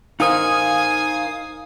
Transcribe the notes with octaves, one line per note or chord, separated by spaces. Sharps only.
D#4 A#4 C5 F5 G#5 D#6